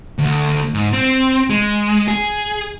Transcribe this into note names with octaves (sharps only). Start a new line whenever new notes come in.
D2
G#2
C4
G#3
G#4